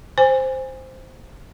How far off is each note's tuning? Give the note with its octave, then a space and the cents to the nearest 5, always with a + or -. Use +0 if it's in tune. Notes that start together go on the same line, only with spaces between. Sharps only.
C5 +0 G#5 -20